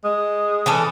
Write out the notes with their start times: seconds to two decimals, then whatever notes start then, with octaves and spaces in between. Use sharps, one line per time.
0.04 G#3 D#6
0.66 E3 C#4 A4